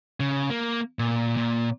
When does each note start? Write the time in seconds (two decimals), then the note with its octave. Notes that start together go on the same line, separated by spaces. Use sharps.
0.20 C#3
0.50 A#3
0.99 A#2
1.37 A#2